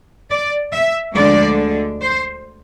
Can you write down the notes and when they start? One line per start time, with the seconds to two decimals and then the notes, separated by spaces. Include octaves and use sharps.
0.30 D5
0.73 E5
1.15 D2 D3 F3 G#3 D4 D5
2.01 C5